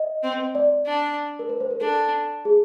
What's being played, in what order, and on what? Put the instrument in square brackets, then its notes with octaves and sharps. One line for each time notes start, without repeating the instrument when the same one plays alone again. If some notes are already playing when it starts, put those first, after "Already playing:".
Already playing: [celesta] D#5
[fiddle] C4
[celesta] D5
[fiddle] D4
[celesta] A#4
B4
C5
A#4
[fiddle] D4 [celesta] A4
[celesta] G#4